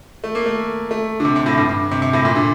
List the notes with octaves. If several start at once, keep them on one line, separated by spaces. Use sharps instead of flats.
A3
A#3
A3
A3
D3
C3
C3
A2
G2
G2
C3
C3
A2
A#2
D3